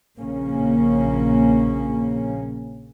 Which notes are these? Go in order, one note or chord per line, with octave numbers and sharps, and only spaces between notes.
A#1 C#3 A#3 C#4